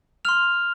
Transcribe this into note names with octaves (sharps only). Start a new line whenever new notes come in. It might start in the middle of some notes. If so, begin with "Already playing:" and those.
C6 F6 F7